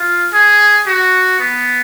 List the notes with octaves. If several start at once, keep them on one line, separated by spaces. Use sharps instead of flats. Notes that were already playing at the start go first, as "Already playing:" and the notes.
Already playing: F4
G#4
F#4
B3